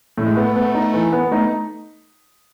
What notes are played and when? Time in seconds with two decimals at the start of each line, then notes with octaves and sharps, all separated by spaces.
0.17 A2 A3
0.26 G#3
0.36 A3 B3
0.56 B3
0.74 D#4
0.94 E3
1.13 B3
1.31 A3 D#4